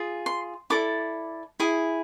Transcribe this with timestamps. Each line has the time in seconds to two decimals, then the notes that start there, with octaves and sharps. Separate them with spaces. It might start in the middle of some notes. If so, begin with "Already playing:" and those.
Already playing: F4 G#4
0.26 C6
0.70 E4 A4 D5 D6
1.60 E4 G#4